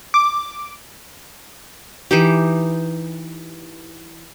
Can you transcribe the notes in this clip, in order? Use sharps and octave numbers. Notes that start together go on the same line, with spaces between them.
D6
E3 D#4 G4